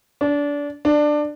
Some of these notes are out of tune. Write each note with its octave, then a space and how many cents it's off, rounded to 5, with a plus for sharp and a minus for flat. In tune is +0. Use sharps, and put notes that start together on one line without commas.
D4 -25
D4 +15